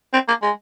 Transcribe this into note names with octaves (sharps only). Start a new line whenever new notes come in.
C4
A#3
G#3